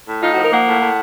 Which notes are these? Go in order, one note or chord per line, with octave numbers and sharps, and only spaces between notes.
A2
D#4 F4
F#4
F3 A#4
A#3 F#5
A2
A2